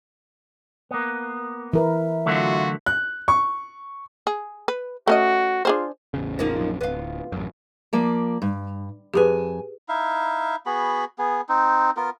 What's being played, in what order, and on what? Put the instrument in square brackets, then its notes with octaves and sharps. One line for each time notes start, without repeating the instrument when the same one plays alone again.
[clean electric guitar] A#3 B3
[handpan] E3 A#4 B4 [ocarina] E5
[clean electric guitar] D3 F#3 A3 [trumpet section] F4 F#4
[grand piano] F#6
C#6
[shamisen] G#4
B4
[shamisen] A3 C#4 D#5 [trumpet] F#4
[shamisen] D4 G#4 C5 [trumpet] F4
[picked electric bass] A1 E2 C#3
[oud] F3 A#3 D#4
[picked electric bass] A#1 F#2
[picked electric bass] D1 [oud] B3 F4
[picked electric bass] A1 F#2
[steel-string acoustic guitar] F3 A#3 D5
G2
[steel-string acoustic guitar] F2 G#5 [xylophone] G4 G#4 B4
[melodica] D#4 E4 E5 F5
B3 F#4 G#4 B5
B3 G#4
C4 D#4
B3 F4 A#4